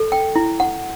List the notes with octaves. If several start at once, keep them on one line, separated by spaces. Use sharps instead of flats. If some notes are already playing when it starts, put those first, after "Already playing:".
Already playing: A4
G5
E4
F#5